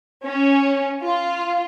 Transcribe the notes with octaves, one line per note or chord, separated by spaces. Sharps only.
C#4
F4